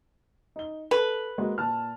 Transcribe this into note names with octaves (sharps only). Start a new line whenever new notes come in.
D#4 G7
A4 B4
G#3 A#3 F#4
A#2 A5 F6